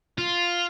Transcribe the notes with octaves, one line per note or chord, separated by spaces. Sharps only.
F4